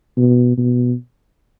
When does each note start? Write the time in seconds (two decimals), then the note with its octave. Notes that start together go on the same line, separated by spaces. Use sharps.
0.17 B2
0.57 B2